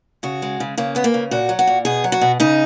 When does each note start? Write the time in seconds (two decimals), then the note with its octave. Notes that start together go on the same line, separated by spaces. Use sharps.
0.23 C#3 F#4
0.42 G#3
0.60 C#3
0.78 C#3 A#3
0.95 G#3 B3
1.04 A#3
1.14 C#3
1.31 A#2 F#4
1.49 F#3
1.59 F#4
1.67 A#2
1.85 B2 G#4
2.04 F#3
2.12 F#4
2.21 B2
2.40 C#3 D#4